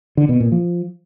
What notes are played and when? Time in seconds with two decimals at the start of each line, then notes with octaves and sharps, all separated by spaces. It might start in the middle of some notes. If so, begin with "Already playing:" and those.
0.17 D3
0.29 B2
0.40 A#2
0.52 F3